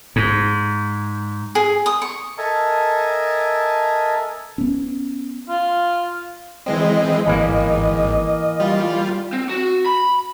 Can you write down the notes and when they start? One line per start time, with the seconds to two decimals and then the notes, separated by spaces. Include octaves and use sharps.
0.16 G#2
1.55 G#4
1.86 D#6
2.02 C#6
2.38 A4 A#4 D#5 E5 G#5 A5
4.58 B3 C#4
5.49 F4
6.66 E3 G#3 C4 D#5
7.26 G#1 E3 A#3
8.60 G3 F4
9.33 C4
9.49 F#4
9.86 B5